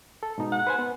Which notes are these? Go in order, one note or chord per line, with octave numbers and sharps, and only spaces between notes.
A4
G#2 B2 D#4
F#5
B4 C5 G#5
B3